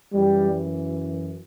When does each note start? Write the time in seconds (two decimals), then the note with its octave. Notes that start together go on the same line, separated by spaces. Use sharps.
0.14 F#2 E3 G3